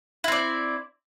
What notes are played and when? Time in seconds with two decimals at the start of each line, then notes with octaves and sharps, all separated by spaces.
0.24 E4
0.28 C4
0.32 D5